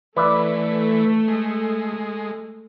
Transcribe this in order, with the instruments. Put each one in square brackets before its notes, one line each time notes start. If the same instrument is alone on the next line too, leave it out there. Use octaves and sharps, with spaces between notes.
[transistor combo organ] E3 [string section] A3 [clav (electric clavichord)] B4 D5 E5
[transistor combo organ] G#3